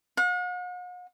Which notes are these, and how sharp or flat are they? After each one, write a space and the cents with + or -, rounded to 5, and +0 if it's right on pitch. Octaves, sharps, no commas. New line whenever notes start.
F#5 -45